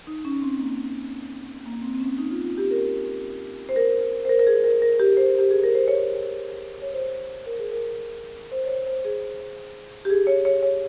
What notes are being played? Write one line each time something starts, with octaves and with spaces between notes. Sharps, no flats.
D#4
C#4
C4
A#3
A#3
C4
C4
C#4
D#4
F4
F4
G4
A#4
C5
A#4
C5
A#4
A#4
G#4
A#4
A#4
G4
C5
G4
G#4
A#4
C5
C#5
C#5
C5
A#4
G#4
A#4
C5
C#5
C5
C5
G#4
G4
G#4
C#5
C#5
C#5